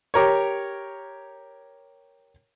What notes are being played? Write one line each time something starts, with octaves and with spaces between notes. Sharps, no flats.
G4 A#4 C#5